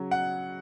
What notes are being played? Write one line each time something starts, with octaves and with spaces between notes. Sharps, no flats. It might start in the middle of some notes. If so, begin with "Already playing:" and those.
Already playing: C#3 F#3
F#5